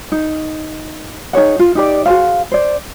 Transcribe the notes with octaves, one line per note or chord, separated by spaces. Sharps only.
D#4
D#4 G#4 C#5 F#5
F4
D#4 G4 D5
F#4 G#4 C5 F5
C5 D5